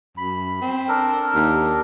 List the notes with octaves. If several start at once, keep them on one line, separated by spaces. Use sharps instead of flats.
F#2 B5
C4
D4 A4 A#4
D#2